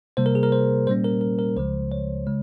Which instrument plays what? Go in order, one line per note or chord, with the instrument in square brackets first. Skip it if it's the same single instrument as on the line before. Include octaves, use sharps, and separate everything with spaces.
[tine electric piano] C3 G3 A#3 C5
A#4
G#4
A#4
C5
A#2 G3 A#3 C#4 C5
A#4
A#4
A#4
C#2 C#3 F3 G#3 C5
C#5
C#3 G#3